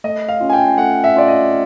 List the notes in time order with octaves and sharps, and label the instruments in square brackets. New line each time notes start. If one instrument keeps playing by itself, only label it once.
[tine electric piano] A3 [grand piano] D#5
[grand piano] F5
[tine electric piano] C#4 F4
[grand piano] G#5
G5
[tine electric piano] A3 [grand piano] F#5
[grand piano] E5
[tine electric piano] C#4 F4 [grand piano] D5
[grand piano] D#5